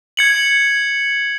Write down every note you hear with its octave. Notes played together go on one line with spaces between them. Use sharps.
G#6 C#7 F#7